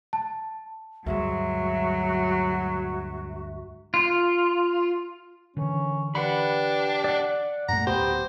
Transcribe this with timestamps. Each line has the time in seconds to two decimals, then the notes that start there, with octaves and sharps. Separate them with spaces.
0.13 A5
1.06 D2 G2 F#3 G#3 F#4 E5
3.94 F4
5.57 D3 E3 C#4
6.15 D4 G4 B4 F#5 B5
7.04 D5 F#5
7.68 F#2 A#2 A3 F#5 A#5
7.87 D1 B3 G4 C5